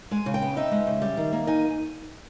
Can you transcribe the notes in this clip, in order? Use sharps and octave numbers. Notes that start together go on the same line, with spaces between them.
G#3 G#5
C#3
G5
B3
D#4 E5
G#3
C#3
G3
D#3
A#3
D#4 G#5